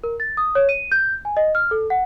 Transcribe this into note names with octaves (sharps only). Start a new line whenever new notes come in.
A#4
A6
D#6
C#5
D#7
G6
G#5
D#5
F6
A4
F#5